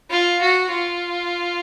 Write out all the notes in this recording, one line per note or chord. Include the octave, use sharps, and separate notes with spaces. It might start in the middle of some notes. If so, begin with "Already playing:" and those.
F4
F#4
F4